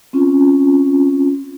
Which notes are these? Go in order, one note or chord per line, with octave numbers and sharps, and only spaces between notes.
C4 C#4 F4